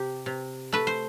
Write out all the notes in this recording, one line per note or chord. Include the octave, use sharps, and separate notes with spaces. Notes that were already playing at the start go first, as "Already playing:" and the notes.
Already playing: C3 G4
C3
A3 B4
C5